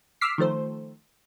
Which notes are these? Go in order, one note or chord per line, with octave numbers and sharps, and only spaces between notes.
D6 E6 F6 B6 C7
D#3 F3 A3 C5